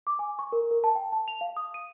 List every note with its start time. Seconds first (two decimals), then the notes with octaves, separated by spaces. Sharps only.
0.07 D6
0.19 G#5
0.39 C#6
0.52 A#4
0.71 A#4
0.84 A5
0.96 G5
1.12 A5
1.28 F7
1.41 F5
1.57 D#6
1.74 D#7